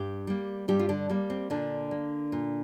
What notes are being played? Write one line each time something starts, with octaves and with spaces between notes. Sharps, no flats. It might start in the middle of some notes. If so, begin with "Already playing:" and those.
Already playing: G2 G4
G3 A#3
G2 G3 G4
F4
D3 D4
G3 A#3
C4
A#2 D3 D4
A#3
A#2